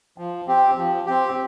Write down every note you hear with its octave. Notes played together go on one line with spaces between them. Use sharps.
F3
C4 G4
F3
C4 G4